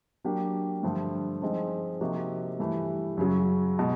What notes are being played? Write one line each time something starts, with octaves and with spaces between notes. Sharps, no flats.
F#3 A#3 D4 G4
G2 D3 F3 A3
F3 G#3 C4 D#4
C3 F3 A#3 D#4 F#4
G2 E3 A3
F#2 C#3 F#3
B2 G#3